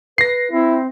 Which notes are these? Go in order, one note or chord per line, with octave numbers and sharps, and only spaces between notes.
B4 A#6 C7
C4 E4